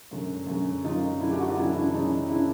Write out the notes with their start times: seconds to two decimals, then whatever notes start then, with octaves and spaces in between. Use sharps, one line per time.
0.11 F#2 D3
0.47 F#2 D3
0.84 F#2 D3 D#4 F4
1.20 F#2 D3 D4 E4
1.31 G4
1.39 F#4
1.48 F4
1.57 F#2 C#3 E3 D4 E4
1.75 D4 E4
1.93 F#2 C#3 E3 C#4 D#4
2.30 C#3 E3 D4 E4